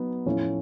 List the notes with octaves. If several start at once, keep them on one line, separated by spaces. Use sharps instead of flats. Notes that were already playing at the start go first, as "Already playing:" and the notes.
Already playing: F#3 B3 D#4
A2 F3 A3 C#4 E4